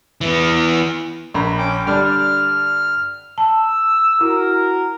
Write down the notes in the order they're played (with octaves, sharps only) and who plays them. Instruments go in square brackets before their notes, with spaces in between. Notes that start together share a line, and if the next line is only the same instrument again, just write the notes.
[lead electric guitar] E3 B3
[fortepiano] A#1 A#5 B5
[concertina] C#4 G5 D6
[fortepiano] D3 G3 D4 [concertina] F6
[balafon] A5 [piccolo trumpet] E6
[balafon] E4 [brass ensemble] F#4 A#4